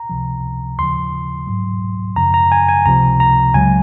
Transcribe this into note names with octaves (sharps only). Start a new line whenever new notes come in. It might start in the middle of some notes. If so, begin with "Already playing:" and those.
Already playing: A#5
C#2 C3 F3
D#2 C#3 F3 C6
G#2 F#3
F#2 C#3 F3 A#5
A#5
G#5
G#5
C#2 C3 F3 A#5
A#5
C#2 C#3 F#3 G#5